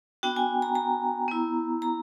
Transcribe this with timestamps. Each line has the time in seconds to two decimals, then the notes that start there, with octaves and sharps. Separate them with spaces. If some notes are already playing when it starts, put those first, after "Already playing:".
0.23 B3 D4 F#4 G5
0.36 G#5
0.62 A#5
0.75 A#5
1.28 B3 E4
1.82 A#5